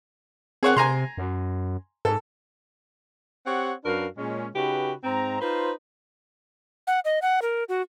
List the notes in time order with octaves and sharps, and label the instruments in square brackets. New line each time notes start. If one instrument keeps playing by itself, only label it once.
[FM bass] C4 [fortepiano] G#4 C#5 F#5
[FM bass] C3 [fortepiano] G#5 A#5 C6
[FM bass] F#2
[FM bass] G#2 [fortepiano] A4
[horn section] C4 G4 C#5 F#5
F#2 D4 F#4 A#4 B4 F5
A#2 G#3 C#4
C#3 D#4 F#4 G4 B4
G#2 C4 A#5
D#4 F4 B4 C5
[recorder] F#5
D#5
F#5
A#4
F#4